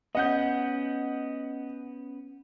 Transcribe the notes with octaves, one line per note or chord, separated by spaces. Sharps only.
B3 C#4 D#5 F#5 G6